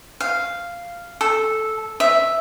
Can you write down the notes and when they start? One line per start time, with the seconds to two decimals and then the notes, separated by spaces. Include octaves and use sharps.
0.20 F5
1.21 A4
2.00 E5